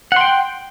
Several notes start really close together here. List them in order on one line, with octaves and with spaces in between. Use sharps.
F#5 C6 G5